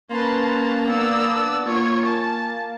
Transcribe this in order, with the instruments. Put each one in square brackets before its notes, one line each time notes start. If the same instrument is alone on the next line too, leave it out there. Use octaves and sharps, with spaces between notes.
[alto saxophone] A#3 [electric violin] C#4 A5 [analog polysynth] B4 A#5 C6
[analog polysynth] B3 D4 [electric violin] D5 E6
[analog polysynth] A#3 [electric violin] F4 C#5
[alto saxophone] G#5 [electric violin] A5